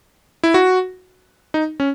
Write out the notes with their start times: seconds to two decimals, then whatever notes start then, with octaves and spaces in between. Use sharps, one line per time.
0.43 E4
0.54 F#4
1.54 D#4
1.80 C#4